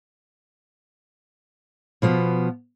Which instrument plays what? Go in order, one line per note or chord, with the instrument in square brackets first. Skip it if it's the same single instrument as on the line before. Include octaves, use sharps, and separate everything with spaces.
[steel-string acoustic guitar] B2 F3 B3